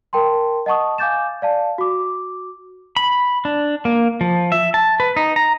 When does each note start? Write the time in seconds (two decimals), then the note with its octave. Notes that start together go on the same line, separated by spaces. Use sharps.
0.13 A#4 G5 A5 C6
0.66 D#5 F#5 A5 C#6 D#6
0.98 F5 G#5 D6 G6 A6 E7
1.42 D5 F5 A5
1.78 F#4 D6
2.96 B5
3.45 D4
3.85 A#3
4.21 F3
4.52 E5
4.74 A5
5.00 B4
5.16 D#4
5.36 A#5